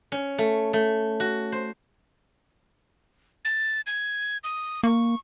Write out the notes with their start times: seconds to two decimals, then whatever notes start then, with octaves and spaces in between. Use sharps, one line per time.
0.12 C#4
0.38 A3
0.73 A3
1.20 F#4
1.52 C5
3.45 A6
3.87 G#6
4.44 D#6
4.83 A#3 C#6